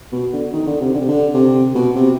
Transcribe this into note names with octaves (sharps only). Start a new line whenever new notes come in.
B2
D3
D#3
D3
C3
D3
C3
D3
C3
B2
C3